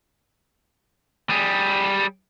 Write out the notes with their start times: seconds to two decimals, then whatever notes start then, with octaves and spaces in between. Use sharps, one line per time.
1.30 G3 G#4